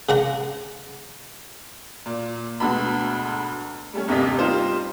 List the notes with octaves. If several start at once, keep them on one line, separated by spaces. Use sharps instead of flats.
C#3 F#5 A#5
A#2
D2 G#2 B2 B3 B5
G3 A3 C#4
G1 D#2 C3 A#3 D#5 B6
G3 C4 D#4 F4 C5